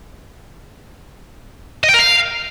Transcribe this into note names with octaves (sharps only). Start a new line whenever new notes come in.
D#5
G5
A#4
F5